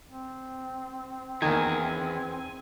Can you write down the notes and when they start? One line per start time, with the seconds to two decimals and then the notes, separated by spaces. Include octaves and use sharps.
0.07 C4
1.42 E2 D#3 A#3 G#5